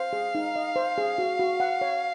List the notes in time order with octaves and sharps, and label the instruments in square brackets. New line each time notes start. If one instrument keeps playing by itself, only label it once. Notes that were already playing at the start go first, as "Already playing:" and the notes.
Already playing: [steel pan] C5 [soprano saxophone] F5
[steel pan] G#4
D#4
D#5
C5
G#4
F#4
F#4
F#5
C#5